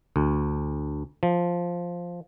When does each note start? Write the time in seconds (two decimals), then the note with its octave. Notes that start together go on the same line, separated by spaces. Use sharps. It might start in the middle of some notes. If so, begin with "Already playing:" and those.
0.16 D2
1.23 F3